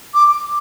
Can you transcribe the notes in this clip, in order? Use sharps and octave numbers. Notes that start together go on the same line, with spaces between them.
D6